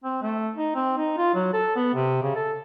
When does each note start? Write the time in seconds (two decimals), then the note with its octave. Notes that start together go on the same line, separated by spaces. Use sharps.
0.04 C4
0.22 A3
0.55 D#4
0.75 C4
0.97 D#4
1.17 F4
1.34 F#3
1.53 A4
1.76 B3
1.94 C3
2.23 C#3
2.36 A4